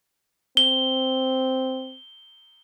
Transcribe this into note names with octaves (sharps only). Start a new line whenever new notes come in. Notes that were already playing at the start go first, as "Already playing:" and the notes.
C4 G7